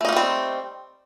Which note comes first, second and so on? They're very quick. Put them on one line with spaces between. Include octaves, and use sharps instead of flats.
A3 D#4 A#3 G3 C4